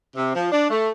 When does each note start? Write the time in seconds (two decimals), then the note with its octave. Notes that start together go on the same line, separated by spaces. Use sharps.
0.15 C3
0.34 F3
0.51 D4
0.69 A3